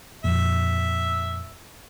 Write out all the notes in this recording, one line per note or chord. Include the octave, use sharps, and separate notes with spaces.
F2 A#2 E5